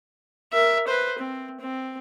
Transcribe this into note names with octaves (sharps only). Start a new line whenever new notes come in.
A#4 E5
B4 C5
C4
C4